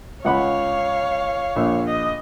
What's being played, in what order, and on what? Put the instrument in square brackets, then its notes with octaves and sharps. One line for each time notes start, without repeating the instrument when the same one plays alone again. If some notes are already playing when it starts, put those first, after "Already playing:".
[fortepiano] C#2 F#5 B5 [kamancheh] C#5 F5
[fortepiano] A#1 E6
[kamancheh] D#5